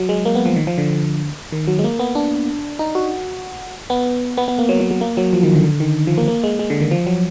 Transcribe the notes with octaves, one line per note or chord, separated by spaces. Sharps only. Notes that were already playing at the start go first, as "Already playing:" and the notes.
Already playing: F#3
G#3
A#3
B3
F3
D#3
F3
D3
D#3
F#3
G#3
A#3
B3
D4
D#4
F#4
B3
B3
B3
A#3
F#3
F#3
F#3
A#3
F#3
F3
D#3
D3
D3
D#3
F3
A#3
A#3
G#3
G#3
D3
D#3
F3
F#3